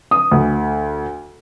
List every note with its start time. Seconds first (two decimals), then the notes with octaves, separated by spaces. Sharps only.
0.11 D#6
0.31 D2